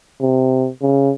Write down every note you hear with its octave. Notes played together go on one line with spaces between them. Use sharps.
C3
C#3